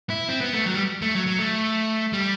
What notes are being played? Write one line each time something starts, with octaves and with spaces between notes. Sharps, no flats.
E4
C4
B3
A3
F#3
G3
A3
F#3
F#3
A3
G3